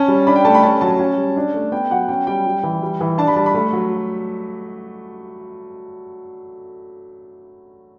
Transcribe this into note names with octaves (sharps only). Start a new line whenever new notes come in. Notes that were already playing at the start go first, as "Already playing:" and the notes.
Already playing: C#4 A5
G3
D4 B5
G5
A3 A5
B5
C#4 A5
F#3 A5
C#4
G3
D4
A3
B3 G5
F#3 F#5
C#4 G5
G3 G5
G3
E3
G3
E3
D4 A5
B5
G3 A5
B5
A3
F#3